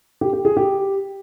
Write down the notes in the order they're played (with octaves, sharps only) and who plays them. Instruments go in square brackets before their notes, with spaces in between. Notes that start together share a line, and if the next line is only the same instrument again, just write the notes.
[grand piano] G4
G4
G#4
G4